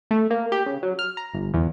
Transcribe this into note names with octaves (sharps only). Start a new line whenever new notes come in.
A3
A#3
G4
C#3
F#3
F6
A#5
G1
E2